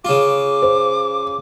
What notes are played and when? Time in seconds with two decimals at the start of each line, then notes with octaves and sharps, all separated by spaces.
0.05 C#3 F4 D6
0.62 C5